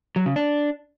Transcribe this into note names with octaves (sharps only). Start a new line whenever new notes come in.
F#3
C#3
D4